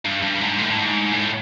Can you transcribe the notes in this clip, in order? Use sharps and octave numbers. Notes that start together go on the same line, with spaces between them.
G2
G2
G#2
A2
A2
G#2
A2